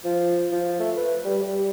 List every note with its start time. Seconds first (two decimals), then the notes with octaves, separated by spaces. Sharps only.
0.05 F3
0.52 F3
0.80 A3
0.97 B4
1.25 G3
1.43 G3